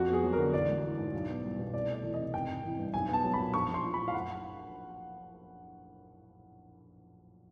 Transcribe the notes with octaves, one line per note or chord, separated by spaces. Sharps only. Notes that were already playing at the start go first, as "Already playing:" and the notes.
Already playing: F2 F#4
B3
G#4
F#3
A#4
D3
A1 D5
G#3
E3
G#2
B1
B3
G3
B2
C2 D5
A3
D5
E3
C3 D#5
G#1 G5
G#1
E3
G2
B1 G#5
B3 A5
F#3
B5
A#2
A#1 C#6
A#1
C6
F3
B5
A2
F5
F#1 F#5